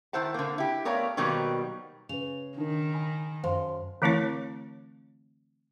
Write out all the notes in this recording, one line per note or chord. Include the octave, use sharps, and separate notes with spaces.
D#3 E4 C5 F#5 A5
D3 A#3
E4 G4
A3 B3 A#4 C#5 D5 F5
B2 D#3 F#3 G3 A#3 C4
C#3 B4 F7
D#3 D4 D#4 A#4
G#5 B5
F#2 C5 F5 A5 C6
D3 E3 A3 C4 E4 C#5